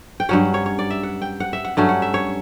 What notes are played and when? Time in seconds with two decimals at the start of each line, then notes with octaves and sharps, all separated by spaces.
0.20 G5
0.29 G2 F#3 C#4 F#5
0.54 C#5
0.66 C#5
0.79 D5
0.90 E5
1.03 F#5
1.22 G5
1.40 F#5
1.53 E5
1.65 F#5
1.77 G2 F#3 A3 C#4 F#5
1.89 F#5
2.02 E5
2.14 C#5